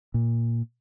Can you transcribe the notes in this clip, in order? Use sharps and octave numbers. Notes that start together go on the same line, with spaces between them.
A#2